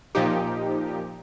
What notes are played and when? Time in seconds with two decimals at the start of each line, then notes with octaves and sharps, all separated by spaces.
0.15 A#2 F3 D#4 G4